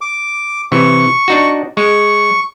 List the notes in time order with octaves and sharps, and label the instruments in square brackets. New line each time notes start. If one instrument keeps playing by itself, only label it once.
[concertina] D6
[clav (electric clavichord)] C3 E3 [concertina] C#6
[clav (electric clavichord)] D4 D#4 F#4
[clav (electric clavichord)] G#3 [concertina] C#6